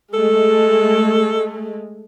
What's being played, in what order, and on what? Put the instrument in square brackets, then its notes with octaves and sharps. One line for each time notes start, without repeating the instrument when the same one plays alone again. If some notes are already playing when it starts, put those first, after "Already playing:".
[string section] G#3 A3 [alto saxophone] A4